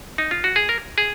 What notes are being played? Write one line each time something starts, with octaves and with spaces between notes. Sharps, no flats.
D#4
F4
F#4
G#4
A#4
G#4